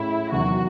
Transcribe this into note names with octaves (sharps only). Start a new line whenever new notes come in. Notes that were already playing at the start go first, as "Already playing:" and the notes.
Already playing: A2 G#3 C#4 E4
E2 C3 D#3 F#3 F#4